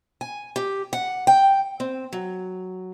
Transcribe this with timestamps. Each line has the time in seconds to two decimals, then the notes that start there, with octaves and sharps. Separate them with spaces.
0.21 G#5
0.56 G4
0.93 F#5
1.27 G5
1.80 C4
2.13 F#3